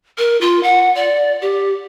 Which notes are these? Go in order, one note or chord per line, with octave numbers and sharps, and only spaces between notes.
A#4
F4
F#5
D5
G4